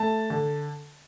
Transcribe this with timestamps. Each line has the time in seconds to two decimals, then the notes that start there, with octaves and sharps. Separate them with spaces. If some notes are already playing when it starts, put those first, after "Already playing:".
Already playing: A3 A5
0.30 D3